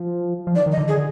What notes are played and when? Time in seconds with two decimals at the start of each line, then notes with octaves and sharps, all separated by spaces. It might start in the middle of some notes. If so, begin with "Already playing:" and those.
Already playing: F3
0.47 F3
0.55 D#3 D5
0.66 D#3
0.72 D#5
0.77 D3
0.88 G#4